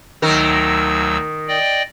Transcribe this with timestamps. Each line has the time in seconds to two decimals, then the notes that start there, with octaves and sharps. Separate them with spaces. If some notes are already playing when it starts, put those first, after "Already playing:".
0.22 D2 D#3 F#3 A#4 E6
1.48 D5 D#5 G5